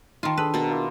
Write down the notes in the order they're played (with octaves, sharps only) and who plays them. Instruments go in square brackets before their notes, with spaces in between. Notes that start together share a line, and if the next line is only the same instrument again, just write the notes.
[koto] D#3 F4 [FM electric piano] D#4 [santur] C5 A5 C6
[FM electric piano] D4 [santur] G#4 A4 [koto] B4
[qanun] B2 A5 B5 [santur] A#4
[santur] A#3 E4 F4